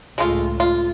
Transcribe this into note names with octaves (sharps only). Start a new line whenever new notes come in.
C#2 A2 G#3 A3 F4
F4